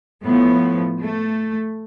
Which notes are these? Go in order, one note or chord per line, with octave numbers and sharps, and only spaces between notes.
A2 F3 B3
A3